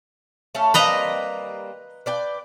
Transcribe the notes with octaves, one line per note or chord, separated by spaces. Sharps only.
A3 C#4 A4
G3 A#3 C4 B4 D#5 A#5
B4 D5 G5